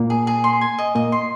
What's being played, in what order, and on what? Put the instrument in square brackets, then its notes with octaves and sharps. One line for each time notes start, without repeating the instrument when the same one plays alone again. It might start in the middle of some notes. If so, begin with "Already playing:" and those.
Already playing: [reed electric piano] A#2 A#3
[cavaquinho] G#4
G#4
C6
G#5
D#5
[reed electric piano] A#2 A#3 [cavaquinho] D#5
[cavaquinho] C6